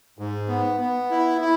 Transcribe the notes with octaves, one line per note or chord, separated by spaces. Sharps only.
G#2
B3
B3
E4
E4